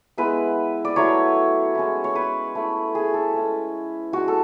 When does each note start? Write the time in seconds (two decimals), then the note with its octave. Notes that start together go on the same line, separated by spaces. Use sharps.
0.18 G#3 B3 E4 B4
0.85 D5
0.96 F#3 A3 E4 C#5
1.75 G#3 C#4 E4
2.04 C#5
2.15 B4
2.55 A3 E4
2.95 G#4
3.14 A4
3.34 G#3 C#4 E4
4.13 G#3 D4 F#4
4.28 A4